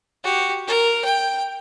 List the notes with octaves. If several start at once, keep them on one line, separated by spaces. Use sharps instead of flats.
F#4 G4
A#4
G5